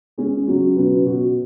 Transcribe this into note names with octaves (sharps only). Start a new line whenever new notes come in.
G#3 C#4 G#4
C#3 F#3 C#4 F#4
B2 F#3 C#4 F#4 B4
B2 B3 F#4